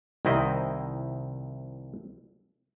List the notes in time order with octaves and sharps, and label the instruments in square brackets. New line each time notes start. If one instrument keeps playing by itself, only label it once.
[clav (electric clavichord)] C2 D#3 C4 E4 D#5